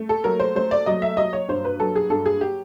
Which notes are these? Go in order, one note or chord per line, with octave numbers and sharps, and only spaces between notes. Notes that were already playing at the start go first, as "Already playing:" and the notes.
Already playing: A3
A4
F#3 A#4
C5
A3 C5
D5
F#3 D#5
E5
F#3 D#5
C#5
G2 C5
B4
F#3 A4
G#4
G2 A4
G#4
G4